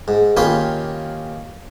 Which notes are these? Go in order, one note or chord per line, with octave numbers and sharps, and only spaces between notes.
G#2
D#2 A#3 C#4 F4 G5 B5